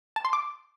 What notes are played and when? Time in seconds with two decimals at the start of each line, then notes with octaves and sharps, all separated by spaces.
0.16 A5
0.25 C6
0.33 D6